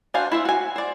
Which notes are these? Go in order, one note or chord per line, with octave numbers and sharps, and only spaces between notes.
D4 F#4 C5 F5 G#5
E4 C5 E5
F#4 G#5
C5 D5